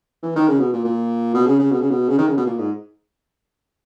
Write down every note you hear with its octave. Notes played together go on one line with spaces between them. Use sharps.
E3
D#3
C#3
B2
A#2
A#2
B2
C#3
C#3
B2
C#3
B2
C#3
D#3
C#3
B2
A#2
G#2